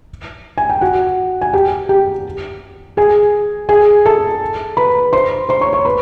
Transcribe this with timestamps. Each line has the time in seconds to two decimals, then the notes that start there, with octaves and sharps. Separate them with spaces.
0.58 G#5
0.70 G5
0.81 F#4 F#5
1.41 G#5
1.53 G4 G5
1.89 G4 G5
2.97 G#4 G#5
3.69 G#4 G#5
4.05 A4 A5
4.77 B4 B5
5.13 C5 C6
5.49 C5 C6
5.61 C#5 C#6
5.73 C#5 C#6
5.85 B4 B5